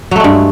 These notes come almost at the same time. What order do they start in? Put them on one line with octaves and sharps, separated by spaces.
F#3 A3 G#3 G2